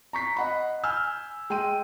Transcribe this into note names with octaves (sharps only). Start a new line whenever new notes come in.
A#5 C#6 B6 C7
D#5 F#5 B5
G#5 E6 F6 G6
G#3 G5 C6 D#7